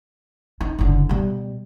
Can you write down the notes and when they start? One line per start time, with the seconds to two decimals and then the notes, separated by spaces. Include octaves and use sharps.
0.61 D#4
0.79 F#1 D3
1.09 B2 G3